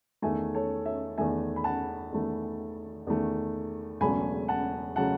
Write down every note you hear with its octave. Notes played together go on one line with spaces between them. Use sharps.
E2 D#3 A3 E5 G#5
A4 C#5
C#5 E5
E2 D#3 A3 E5 G#5
B5
F#5 A5
E2 D#3 A3
E2 D#3 A3
E1 E2 C#3 F#3 A3 G#5 B5
F#5 A5
C#3 F#3 A3 F#5 A5